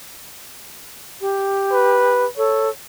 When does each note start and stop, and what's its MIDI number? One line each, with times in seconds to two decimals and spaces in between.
1.21 2.25 67
1.72 2.27 71
2.37 2.70 69
2.37 2.70 73